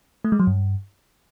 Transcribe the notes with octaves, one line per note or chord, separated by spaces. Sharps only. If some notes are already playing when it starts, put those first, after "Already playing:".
A3
G#3
F#3
G2